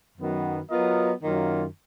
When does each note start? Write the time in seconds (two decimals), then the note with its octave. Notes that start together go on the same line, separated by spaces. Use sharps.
0.18 F#2 D#3 F#3 B3 F#4
0.70 F#3 B3 F4 A#4 D#5
1.23 F#2 D#3 F#3 A#3 F4